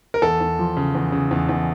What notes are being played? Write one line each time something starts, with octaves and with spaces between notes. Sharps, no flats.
A#4
E2 A4
E2
F3
C#3
E2
C#3
E2
E2